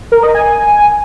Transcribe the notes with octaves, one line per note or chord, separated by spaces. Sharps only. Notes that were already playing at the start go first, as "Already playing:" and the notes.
A#4
D#5
G#5